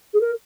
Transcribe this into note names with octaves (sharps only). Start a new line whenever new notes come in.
G#4
A#4